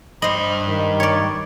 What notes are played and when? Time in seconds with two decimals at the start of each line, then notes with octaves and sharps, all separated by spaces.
0.22 G2 C5 D#5 B5
0.68 D#3
1.00 C#5 D5